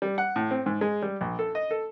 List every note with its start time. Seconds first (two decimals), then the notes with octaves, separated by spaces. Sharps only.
0.02 G3
0.18 F#5
0.36 A2
0.51 C4
0.66 G#2
0.81 G#3
1.02 G3
1.21 A#1
1.39 A4
1.55 D#5
1.71 A4